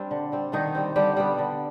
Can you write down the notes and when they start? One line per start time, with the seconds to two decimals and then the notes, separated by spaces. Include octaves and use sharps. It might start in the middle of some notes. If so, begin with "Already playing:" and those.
Already playing: G3 C4 D4
0.11 D3
0.32 G3 C4
0.52 D3 D#3 D#4
0.75 G3 C4
0.96 D3 G3 G4
1.17 G3 B3
1.38 D3